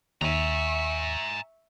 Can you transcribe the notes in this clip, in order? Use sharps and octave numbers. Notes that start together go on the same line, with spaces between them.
D#2 E5 G#5 A#5 C#6